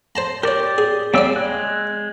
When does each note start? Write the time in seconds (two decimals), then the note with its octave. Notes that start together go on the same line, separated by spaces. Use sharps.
0.15 C5 A5 A#5
0.43 G4 A#4 C#5 D5
0.78 G#4
1.14 D#2 C#3 G3 D5 G5 E6
1.36 G#3 F#6